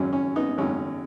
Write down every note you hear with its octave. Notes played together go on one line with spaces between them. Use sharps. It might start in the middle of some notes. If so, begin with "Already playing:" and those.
Already playing: G#1 F#2 C#3 F#3 C#4
C#4
B3 D#4
G#1 F#2 C#3 F#3 C#4